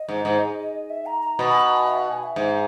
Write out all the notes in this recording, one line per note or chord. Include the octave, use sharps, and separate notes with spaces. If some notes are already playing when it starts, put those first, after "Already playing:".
Already playing: D#5
G#2
G#2
E5
A#5
A#5
B2 B5
G#5
B5
A#5
G#5
E5
F#5
G#5
E5
G#2